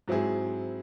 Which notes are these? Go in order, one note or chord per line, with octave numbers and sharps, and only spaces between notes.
G#2 F#3 C4 E4 G#4